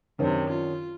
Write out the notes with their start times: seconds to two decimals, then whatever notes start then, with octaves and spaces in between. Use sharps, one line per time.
0.19 F#2 C3 D#3 C#4 D4
0.50 F4